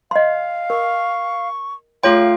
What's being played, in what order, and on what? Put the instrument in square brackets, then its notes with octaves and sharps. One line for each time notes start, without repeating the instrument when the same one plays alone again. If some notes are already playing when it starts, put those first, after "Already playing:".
[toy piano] D#5 C6 [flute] F5
[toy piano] A#4 [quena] C#6
[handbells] A3 F4 G5 [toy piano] G#4 C#5 C6 [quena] F5